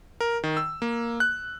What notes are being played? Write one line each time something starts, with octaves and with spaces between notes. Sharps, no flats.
A#4
D#3
E6
A#3
F#6